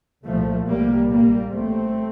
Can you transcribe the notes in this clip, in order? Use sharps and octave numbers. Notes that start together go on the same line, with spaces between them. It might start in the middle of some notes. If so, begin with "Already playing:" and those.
C2 A#2 F3 A3
C2 A#2 G3 A#3
A#1 A#2 G3 A#3
A1 A2 A3 C4